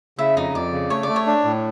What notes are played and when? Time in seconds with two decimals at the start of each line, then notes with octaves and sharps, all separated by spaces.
0.18 C#3 E4 E5
0.36 F2 D#4 D#5
0.54 F2 D5
0.72 C#3
0.90 A3 C#5
1.03 D5
1.08 A3
1.16 C#5
1.26 D4
1.44 A2